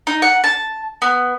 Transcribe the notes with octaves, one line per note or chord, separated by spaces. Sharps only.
D#4
F#5
A5
B3